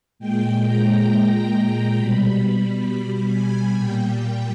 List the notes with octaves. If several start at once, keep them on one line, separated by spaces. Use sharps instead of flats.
A#2 G#3 G5
A#5
B2 G3 B5
B5
B5
G#5
A#2 G3 G5